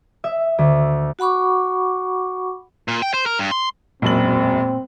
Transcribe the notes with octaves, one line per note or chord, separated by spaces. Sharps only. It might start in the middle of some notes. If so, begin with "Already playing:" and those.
E5
D2
F#4 F#5 B5 C#6 D6
A#2
G5
C5
A#4
G2
C6
E1 F#2 A#2 C4 F#7